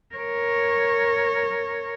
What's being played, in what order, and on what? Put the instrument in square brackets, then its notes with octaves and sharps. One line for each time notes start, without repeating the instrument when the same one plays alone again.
[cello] A#4 C#5